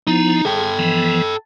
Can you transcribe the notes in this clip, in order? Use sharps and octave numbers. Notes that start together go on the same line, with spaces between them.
F3 B3 D#4 E4
G#4 A4 G5
E3 F3 B3